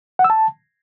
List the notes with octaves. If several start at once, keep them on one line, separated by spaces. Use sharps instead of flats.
F#5
E6
A5